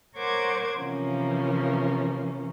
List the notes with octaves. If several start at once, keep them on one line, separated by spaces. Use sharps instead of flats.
A#4 C5 C#5 F#5 D6 G#6
C3 E3 F3 A#3 C#4